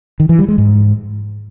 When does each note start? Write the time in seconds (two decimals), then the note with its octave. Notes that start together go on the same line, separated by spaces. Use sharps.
0.20 D#3
0.29 E3
0.39 G3
0.48 G#3
0.58 G#2